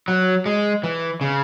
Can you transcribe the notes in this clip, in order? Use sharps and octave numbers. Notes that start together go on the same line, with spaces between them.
F#3
G#3
E3
C#3